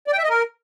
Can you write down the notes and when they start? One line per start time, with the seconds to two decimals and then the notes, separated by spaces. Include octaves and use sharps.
0.07 D5
0.13 G5
0.18 E5
0.24 D#5
0.29 A#4